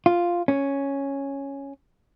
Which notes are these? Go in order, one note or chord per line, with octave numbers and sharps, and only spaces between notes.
F4
C#4